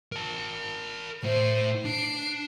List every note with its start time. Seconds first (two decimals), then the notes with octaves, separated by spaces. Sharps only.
0.12 A#4 A5
1.24 A2 C5
1.85 D4 C7 D7